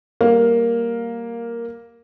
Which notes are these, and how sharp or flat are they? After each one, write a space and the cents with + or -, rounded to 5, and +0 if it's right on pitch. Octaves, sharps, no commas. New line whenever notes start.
G3 +0 A#3 +0 F5 +10